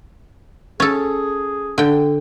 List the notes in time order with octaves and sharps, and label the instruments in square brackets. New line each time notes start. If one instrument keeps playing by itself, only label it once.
[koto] C#4 A4 [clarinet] G#4
[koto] D3 G5